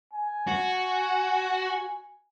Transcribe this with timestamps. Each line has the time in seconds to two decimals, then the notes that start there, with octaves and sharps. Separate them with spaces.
0.13 G#5
0.47 F#4